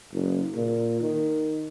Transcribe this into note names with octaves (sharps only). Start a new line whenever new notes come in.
F#1
A#2
D#3